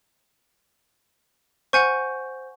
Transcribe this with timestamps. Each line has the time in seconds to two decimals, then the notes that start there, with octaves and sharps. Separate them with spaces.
1.73 C5 F#5 G#5 C#6 G6